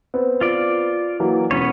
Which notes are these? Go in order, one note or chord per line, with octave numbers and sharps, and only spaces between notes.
B3 C4
F4 D5
E3 F#3 A#3
E1 B3 C#4 C#5